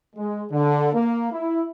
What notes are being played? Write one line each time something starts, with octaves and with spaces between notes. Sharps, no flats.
G#3
D3
A#3
E4